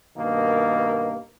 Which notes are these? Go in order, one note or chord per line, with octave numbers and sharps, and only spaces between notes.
G2 B2 D#3 A#3